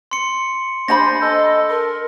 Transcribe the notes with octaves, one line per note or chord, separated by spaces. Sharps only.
C6 C#7
D4 C5 G#5 B5 A#6
A4 D#5
A#4